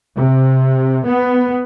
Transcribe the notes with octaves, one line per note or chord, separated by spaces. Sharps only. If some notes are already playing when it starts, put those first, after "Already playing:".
C3
B3